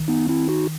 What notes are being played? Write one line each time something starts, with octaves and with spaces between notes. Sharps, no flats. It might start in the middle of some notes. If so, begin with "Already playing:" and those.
Already playing: D#3
B3 D#4
C4 E4
D#4 F#4